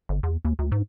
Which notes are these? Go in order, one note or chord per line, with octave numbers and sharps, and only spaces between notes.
G1
E2
D#2
D2
G#2